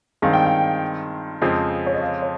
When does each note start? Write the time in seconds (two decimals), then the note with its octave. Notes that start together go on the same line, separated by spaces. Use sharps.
0.22 G2 D#3 G#3 C4 F5
0.33 G5
0.45 F5
1.42 F2 C#3 F3 G#3 C4
1.86 C#5
1.94 D#5
2.02 F5
2.22 C#5